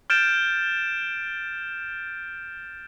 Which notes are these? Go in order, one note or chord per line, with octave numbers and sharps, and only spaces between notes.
F6 G6 A6 D7 E7